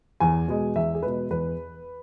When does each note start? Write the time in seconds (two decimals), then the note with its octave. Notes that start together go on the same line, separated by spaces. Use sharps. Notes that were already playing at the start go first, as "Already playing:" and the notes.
0.20 E2 G#5
0.48 B2 G#3
0.76 E2 E5
0.95 G#4
1.03 B2 G#3 B4
1.30 E2 B4